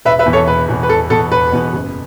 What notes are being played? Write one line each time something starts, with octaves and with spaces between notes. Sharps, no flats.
E1 B4 E5
B4 E5
E2 B2 B3
A4 C#5
E1 B4
E2 B2 B3
B4
E1 A4
E2 B2 B3 A4
E1 B4
E2 B2 B3
F#1